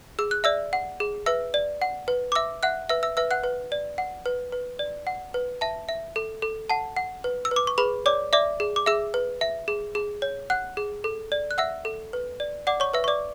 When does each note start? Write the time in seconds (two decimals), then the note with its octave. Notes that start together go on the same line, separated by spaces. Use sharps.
0.19 G#4 E6
0.31 F#6
0.44 D5 E5 E6
0.73 F#5
1.00 G#4
1.26 B4 E5 E6
1.54 D5
1.82 F#5
2.08 B4
2.32 D6
2.35 E5 E6
2.63 E5 F#5 F#6
2.89 B4 E5 E6
3.03 E5 E6
3.17 B4 E5 E6
3.31 F#5 F#6
3.43 B4
3.72 D5
3.98 F#5
4.26 B4
4.52 B4
4.79 D5
5.07 F#5
5.34 B4
5.61 E5 A5
5.89 E5
6.16 A4
6.42 A4
6.70 F#5 A5
6.97 F#5
7.24 B4
7.45 E6
7.51 B4
7.56 D6
7.67 C#6
7.78 G#4 B4 B5
8.06 C#5 D5 D6
8.33 D5 E5 D6
8.60 G#4
8.76 D6
8.86 G#4 E5 E6
9.14 B4
9.41 E5
9.68 G#4
9.95 G#4
10.22 C#5
10.50 F#5 F#6
10.77 G#4
11.04 A4
11.32 D5
11.51 F#6
11.58 E5 F#5 E6
11.85 A4
12.13 B4
12.40 D5
12.67 D5 F#5 D6
12.80 C#5 C#6
12.94 B4 E5 E6
13.04 C#6
13.08 D5 D6